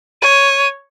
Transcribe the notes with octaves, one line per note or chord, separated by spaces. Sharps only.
C#5 D#7